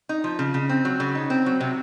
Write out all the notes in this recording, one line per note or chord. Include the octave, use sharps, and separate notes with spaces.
D#4
F3
C#3
C#3
C4
F#3
C#3
D#4
C4
F#3
C3